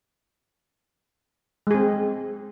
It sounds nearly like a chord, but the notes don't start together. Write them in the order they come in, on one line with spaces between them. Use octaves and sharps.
G#3 G#4 C4